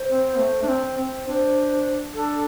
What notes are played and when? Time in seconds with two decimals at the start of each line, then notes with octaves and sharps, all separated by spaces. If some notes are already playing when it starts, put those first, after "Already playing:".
Already playing: C5
0.10 C4
0.38 A3
0.63 D4
0.68 C4
0.98 C4
1.27 D4 C5
2.14 D4 A4